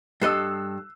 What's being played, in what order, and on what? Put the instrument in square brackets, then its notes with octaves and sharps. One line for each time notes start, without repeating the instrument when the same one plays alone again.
[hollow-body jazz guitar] G2 A4 D#5 [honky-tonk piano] E6 F#6 C7